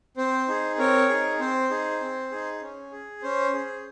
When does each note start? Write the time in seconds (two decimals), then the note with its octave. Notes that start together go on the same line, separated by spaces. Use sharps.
0.17 C4 C5
0.48 D#4 G#4
0.78 C4 A#4 C#5
1.09 D#4 G#4
1.39 C4 C5
1.71 D#4 G#4
2.01 C4
2.31 D#4 G#4
2.62 C#4
2.92 G#4
3.23 C#4 C5
3.53 G#4